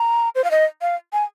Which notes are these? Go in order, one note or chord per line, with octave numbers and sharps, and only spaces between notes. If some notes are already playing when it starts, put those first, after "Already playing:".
Already playing: A#5
C5
F5
D#5
F5
G#5